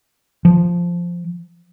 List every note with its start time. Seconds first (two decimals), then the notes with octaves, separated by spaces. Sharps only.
0.45 F3